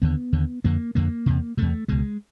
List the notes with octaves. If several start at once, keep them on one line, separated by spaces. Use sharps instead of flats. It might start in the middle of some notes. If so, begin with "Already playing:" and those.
D#2 D3 B3
D#2 D3
F2 D3 A#3
F2 D3 A#3
E2 C3
E2 C3 A3
C#2 B2 G#3